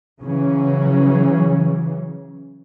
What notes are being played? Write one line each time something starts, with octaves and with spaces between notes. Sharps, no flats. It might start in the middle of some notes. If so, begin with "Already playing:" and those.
C#3 E3 F#3 C#4